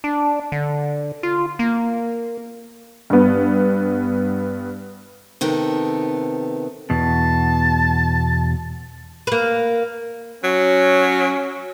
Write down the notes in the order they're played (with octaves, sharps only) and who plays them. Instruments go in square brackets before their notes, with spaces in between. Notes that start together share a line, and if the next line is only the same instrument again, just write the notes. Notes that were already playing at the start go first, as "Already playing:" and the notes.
[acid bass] D4
D3
F4
A#3
[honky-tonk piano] G2 B3
[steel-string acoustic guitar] C3 D#3 B3 A4
[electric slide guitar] E2 B2 [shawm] A5
[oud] A#3 B4
[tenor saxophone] F#3 [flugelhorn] C#4